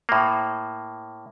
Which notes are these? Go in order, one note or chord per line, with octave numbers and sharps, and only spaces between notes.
A2 A#3